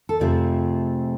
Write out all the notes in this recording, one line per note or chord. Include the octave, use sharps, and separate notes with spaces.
A4
F2 C3 F3 A3 G#4